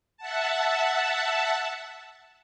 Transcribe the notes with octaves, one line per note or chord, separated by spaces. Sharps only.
E5 F#5 A5